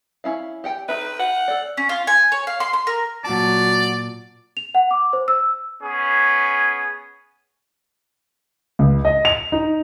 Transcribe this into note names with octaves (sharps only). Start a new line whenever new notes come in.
C#4 E4 F5
G4 F#5 G5
D#4 B4 E5
F#5
A4 D5
C#4
F4
G#5
C#5
F5
C6
C6
A#4
A#2 F#3 D5 A5
F7
F#5
D6
C5
E6
B3 C#4 G#4
C#2
D#5
F7
D#4